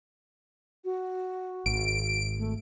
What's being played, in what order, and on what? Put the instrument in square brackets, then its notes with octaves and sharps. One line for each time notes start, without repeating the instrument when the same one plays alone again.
[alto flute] F#4
[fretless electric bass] G#1 [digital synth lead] D7
[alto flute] A3